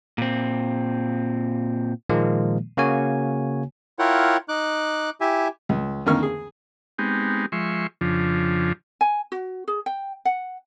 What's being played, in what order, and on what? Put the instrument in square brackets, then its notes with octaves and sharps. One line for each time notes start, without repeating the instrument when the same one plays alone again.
[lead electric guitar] A#2 C4
[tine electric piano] A#2 D#3 F3 G#3 A#3
C#3 A#3 F#4 C#5 G#5
[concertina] E4 F4 A#4 C#5 F#5 G5
D#4 D6 F#6
E4 G4 E5 G#5
[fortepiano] C#2
F2 D3 D#3 A#3 C#6 F6
G#4
[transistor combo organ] G#3 B3 C4 D#4 G4
F3 G#3 E5 C6 C#6
F2 C#3 F3 D4
[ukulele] G#5
F#4
G#4
G5
F#5